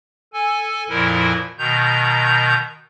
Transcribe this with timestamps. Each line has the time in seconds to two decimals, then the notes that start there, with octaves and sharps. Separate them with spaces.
0.33 A4 G#5
0.89 F2 A#2 F3 E4 A#4
1.58 B2 D#3 A#5 G6